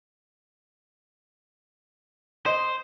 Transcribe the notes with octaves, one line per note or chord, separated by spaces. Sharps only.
C5 D#5